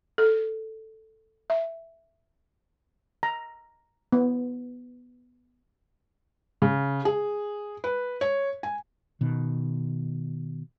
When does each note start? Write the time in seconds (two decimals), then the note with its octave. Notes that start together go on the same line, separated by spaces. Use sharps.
0.18 A4
1.50 E5
3.23 A#5
4.12 B3
6.62 C#3
7.05 G#4
7.84 B4
8.21 C#5
8.63 G#5
9.21 B2 D#3